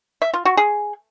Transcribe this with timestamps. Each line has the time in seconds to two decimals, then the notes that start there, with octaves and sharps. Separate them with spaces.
0.22 E5
0.34 F4
0.45 F#4
0.57 G#4